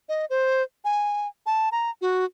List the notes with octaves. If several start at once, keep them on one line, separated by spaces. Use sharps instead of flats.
D#5
C5
G#5
A5
A#5
F#4